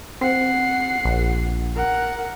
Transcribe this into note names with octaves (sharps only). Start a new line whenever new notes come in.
C4 F#5 C7
A#1
A#4 F#5